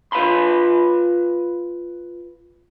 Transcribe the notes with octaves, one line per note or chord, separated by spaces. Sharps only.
F4 B4 F5 B5 C6